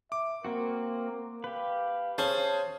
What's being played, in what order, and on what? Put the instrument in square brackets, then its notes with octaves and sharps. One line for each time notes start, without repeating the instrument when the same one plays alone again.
[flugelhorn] E5 [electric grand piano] D6
[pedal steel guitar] A#3 C4 F#4 [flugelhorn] A#4
[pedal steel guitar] G4 B4 [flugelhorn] F5
[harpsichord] C#4 [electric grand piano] G#4 C5 A5